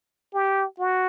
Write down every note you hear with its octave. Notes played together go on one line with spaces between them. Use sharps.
G4
F#4